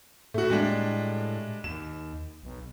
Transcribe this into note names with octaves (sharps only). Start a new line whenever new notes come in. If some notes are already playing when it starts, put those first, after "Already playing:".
A2 A3 F#4
G3 G#3 D4
D#2 E7
B1